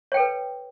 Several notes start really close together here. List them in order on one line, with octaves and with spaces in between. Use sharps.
C#5 G5 A4 B4